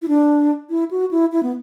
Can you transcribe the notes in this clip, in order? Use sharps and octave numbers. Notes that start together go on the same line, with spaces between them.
E4
D4
E4
F#4
E4
E4
B3